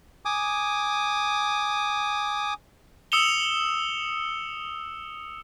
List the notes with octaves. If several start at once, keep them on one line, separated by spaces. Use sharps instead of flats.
G#5 D6 D#6
D#6 E6 C#7 E7 F7 G7